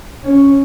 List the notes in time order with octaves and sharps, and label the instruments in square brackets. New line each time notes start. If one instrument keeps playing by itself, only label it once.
[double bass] C#4